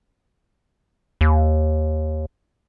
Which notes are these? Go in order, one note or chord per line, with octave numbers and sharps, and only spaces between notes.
D#2